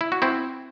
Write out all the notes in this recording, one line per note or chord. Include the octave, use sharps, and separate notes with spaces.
E4
F#4
C4 E4